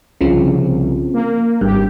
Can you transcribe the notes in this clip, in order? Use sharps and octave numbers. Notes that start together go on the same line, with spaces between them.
C2 C#3 F3 C4
A#3
G#1 G2 G4